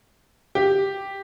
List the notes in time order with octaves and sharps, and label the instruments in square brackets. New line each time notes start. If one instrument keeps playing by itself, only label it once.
[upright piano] G4